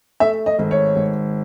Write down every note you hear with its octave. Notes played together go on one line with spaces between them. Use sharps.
A3 E5
D#5
G#1
C#5
G#1